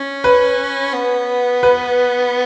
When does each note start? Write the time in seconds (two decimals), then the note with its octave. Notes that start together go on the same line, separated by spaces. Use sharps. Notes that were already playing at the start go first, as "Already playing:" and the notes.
Already playing: C#4
0.24 B4
0.93 B3
1.63 B4